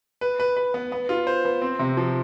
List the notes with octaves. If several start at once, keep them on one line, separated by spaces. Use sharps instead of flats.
B4
B4
B4
B3
B3
F4
C5
B3
C4
C3
F3